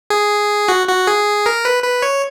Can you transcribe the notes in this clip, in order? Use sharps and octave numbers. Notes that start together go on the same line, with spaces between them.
G#4
F#4
F#4
G#4
A#4
B4
B4
C#5